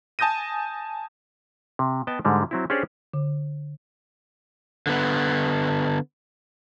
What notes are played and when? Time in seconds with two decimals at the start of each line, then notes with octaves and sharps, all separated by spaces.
0.19 G#5 A5 D#6 G6 A#6 D#7
1.79 C3
2.07 B3 D#5 G5 A5
2.25 G#2 D3 G3 G#3
2.51 F#3 C4 E4
2.70 C#4 D4 G4 G#4 C5 D5
3.14 D3
4.87 D3 B3